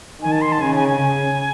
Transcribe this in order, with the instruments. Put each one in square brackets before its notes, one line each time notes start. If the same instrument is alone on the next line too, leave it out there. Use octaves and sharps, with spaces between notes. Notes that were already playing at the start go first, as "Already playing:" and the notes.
[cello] D#3 [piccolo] G#5
[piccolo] A5
C6
A5
[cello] C#3 [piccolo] G#5
[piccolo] G#5
G#5